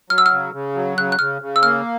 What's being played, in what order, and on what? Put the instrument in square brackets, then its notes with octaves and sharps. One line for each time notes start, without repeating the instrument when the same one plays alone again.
[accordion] F#3 [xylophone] F6
[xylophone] E6
F6
[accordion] C#3
C#3
F#3
[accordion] C#3 [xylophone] F#6
[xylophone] F#6
[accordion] C#3 [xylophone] F6
[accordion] C#3
[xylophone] E6
[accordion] A#3 [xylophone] F6